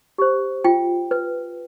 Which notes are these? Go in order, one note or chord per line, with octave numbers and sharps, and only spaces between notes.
G4 C5
F4 G5
B4